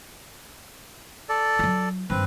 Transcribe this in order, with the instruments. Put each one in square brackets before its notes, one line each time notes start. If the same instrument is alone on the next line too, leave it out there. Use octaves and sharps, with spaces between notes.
[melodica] A4 D5
[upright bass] F#3 F4
[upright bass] G2 D#3 [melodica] C4 B4